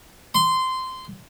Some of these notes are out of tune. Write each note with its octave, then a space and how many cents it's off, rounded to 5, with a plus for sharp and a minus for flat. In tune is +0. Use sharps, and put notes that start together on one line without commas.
C6 -15